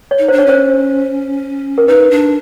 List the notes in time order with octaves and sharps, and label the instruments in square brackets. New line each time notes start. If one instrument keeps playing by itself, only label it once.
[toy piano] C#5
[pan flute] D#4
[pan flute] D4 [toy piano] C5
[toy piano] C#5
[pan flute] C#4 [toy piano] C5
[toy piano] A#4
[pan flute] D#4 [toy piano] B4
[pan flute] D4